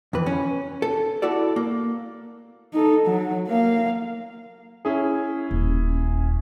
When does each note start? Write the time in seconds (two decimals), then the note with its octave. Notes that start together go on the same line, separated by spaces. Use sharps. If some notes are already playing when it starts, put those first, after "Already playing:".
0.13 F2 E3 B4
0.26 C#4
0.82 A4
1.22 E4 F#4 A4 D5
1.56 A#3
2.74 D#4 A4
3.06 F#3
3.47 A#3 F5
4.85 C#4 E4 G#4
5.51 D#1